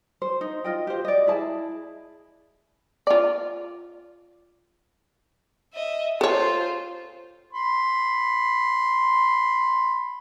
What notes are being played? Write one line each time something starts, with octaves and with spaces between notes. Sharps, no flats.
C5
D#4
F4 D#5 G5
G4 C5
D5 D#5
E4 G#4 A5
F4 D5
D#5 E5
F4 A4 C5 C#5
B5 C6